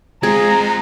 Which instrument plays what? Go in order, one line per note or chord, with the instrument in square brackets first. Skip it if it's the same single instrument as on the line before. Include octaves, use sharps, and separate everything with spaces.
[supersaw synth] G#3 [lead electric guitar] C4 F4 [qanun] G#4 [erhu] A#5